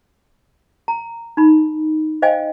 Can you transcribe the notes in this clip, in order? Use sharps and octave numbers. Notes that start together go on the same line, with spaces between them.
A#5
D#4 B5
C5 D#5 F5 G5 G#5